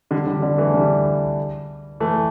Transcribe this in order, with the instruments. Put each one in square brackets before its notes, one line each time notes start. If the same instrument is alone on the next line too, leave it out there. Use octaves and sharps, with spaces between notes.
[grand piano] D3 G3
D3 G3
D3 G3
E3 A3
D3 G3
E3 A3